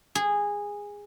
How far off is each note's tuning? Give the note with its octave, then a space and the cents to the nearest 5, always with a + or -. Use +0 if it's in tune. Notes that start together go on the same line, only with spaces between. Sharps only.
G#4 -15